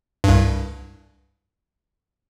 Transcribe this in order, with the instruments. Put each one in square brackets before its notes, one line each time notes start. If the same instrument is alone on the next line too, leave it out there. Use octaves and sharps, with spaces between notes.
[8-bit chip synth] C2 G2